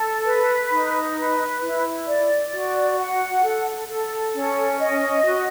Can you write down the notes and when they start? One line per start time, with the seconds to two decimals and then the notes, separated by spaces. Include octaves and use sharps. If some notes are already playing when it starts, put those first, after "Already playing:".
Already playing: A4
0.26 B4
0.71 D#4
1.17 B4
1.62 E4
2.07 D5
2.53 F#4
2.98 F#5
3.44 A4
3.89 A4
4.34 C#4
4.79 D#5
5.25 F#4